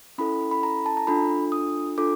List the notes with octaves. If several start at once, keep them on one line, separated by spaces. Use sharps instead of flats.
C#4 E4 A4 B5
B5
A#5
A5
A#5
D4 F4 A4 B5
D#6
D4 F4 A4 D6